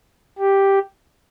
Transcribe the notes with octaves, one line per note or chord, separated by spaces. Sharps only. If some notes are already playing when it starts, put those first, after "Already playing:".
G4